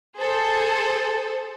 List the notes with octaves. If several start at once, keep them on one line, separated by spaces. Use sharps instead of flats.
G#4 A4 C5 A5